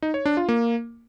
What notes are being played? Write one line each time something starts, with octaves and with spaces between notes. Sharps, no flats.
D#4
C#5
D4
F4
A#3